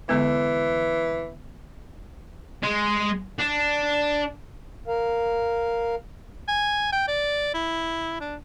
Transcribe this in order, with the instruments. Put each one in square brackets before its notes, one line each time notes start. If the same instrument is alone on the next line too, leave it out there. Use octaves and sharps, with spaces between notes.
[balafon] D3 G#3 B3 [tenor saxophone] E3
[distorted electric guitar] G#3
D4
[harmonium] A#4 F5
[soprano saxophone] G#5
G5
D5
E4
D4